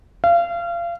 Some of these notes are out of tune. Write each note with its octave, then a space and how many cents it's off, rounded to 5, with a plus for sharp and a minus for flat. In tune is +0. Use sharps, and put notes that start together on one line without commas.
F5 -30